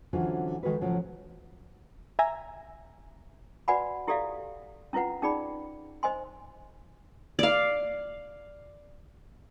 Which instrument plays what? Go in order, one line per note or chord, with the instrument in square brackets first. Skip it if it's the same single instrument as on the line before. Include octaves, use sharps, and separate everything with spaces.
[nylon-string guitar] D3 E3 F#3 C4 C#4 F4
D#3 G#3 F#4 A4 B4
A2 C#3 F3 F#3
[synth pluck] E5 G#5 A#5
[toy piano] F#4 B4 D5 F#5 G#5 B5
E4 G4 A4 D5 E5 F5
C#4 E4 F4 B4 F#5
C#4 D#4 G#4 D5 B5
C5 D#5 G#5 C6
[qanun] D5 F5